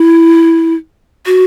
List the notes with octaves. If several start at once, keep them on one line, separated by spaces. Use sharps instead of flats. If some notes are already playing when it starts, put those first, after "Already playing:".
Already playing: E4
F#4